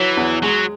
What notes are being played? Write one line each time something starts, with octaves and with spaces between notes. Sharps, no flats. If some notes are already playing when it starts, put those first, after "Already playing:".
Already playing: E3 F#3
E2
F#3 G#3